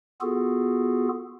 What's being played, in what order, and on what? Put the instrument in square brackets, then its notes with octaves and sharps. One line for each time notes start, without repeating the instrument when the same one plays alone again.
[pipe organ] B3 F4 F#4 G#4 A4